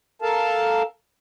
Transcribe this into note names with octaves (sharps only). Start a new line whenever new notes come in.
A4 A#4 F5 A5